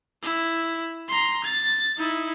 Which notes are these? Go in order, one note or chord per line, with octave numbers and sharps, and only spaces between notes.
E4
A#5 C6
A6
D#4 E4